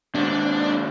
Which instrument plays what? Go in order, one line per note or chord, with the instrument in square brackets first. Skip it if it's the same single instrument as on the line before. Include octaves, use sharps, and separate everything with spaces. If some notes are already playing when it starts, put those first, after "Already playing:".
[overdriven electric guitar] D#2 G#2 [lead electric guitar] D4